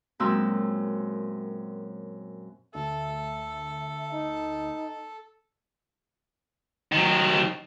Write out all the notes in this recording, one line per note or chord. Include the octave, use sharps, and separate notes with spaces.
F#2 A#2 G#3 C4 E6
D2 A4 E5
D#4
D#3 F#3